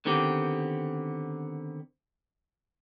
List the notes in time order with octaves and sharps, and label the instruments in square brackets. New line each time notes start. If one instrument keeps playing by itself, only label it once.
[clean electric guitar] D3 D#3 B3 C4 G4